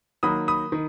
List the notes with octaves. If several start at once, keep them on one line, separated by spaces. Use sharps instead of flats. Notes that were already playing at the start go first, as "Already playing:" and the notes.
D#3 F#3 A#3 B5 D#6
B5 D#6
D#3